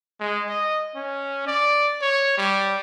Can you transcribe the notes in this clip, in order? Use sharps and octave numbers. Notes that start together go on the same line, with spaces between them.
G#3
D#5
C#4
D5
C#5
G3